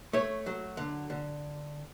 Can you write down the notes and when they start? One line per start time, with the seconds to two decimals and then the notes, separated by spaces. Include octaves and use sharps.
0.13 A3 C#5
0.46 F#3
0.77 D3
1.10 D3